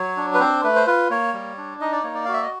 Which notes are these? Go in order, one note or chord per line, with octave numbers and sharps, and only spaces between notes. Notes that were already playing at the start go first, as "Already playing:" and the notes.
Already playing: F#3 C#5
D4
B4
C4 C5
A3 B4
C5
F4 B4
A#3 C#5
G3
D4
D#4 D#5
D5
A#3 C#5
D5
F#4 F5
E5
D#5